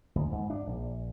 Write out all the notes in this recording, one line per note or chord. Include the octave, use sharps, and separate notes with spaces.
D2
G#2
D4
A#1